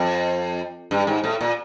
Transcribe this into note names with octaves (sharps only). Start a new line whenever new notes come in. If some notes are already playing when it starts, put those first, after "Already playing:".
Already playing: F2
G2
G#2
A2
A#2